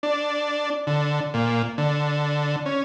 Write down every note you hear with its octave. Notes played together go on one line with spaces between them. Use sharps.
D4
D3
A#2
D3
C#4